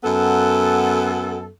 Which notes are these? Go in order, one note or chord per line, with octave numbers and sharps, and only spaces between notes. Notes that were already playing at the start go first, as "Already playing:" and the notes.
F#2 B3 A4